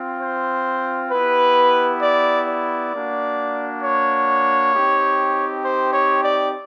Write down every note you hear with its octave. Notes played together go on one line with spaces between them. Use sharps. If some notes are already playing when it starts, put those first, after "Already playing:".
Already playing: C4 F4
C5
B3 E4 G4 B4
D5
D5
A#3 D4 F#4
C#5
C4 D#4 G4
C5
C#5
D5